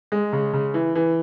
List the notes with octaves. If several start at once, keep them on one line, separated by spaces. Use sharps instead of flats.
G#3
C#3
C#3
E3
E3